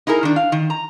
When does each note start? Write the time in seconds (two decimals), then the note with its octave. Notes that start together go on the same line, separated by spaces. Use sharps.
0.07 D#4 E4 G#4 A#4
0.23 D#3 D4
0.36 F5
0.52 D#3
0.70 A#5